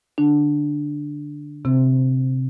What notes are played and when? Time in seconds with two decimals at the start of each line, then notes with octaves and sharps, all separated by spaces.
0.18 D3 D4
1.65 C3 C4